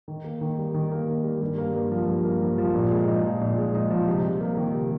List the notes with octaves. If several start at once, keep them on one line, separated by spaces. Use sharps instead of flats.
D#3
A#3
D#3
G3
D#3
A#3
D#3
G3
G2
A#3
G2
F3
G2
A#3
G2
F3
A#2
G#3
D#4
F3
A#2
G#3
D#4
F3
C3
G3
A#3
D#3
C3